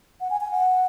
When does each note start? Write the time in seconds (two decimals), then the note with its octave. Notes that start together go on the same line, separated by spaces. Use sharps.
0.21 F#5
0.30 G#5
0.41 G#5
0.51 F#5